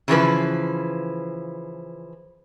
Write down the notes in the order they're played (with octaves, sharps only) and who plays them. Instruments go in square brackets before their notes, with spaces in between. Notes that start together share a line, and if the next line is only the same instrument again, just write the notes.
[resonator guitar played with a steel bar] C#3 E3 F3 B4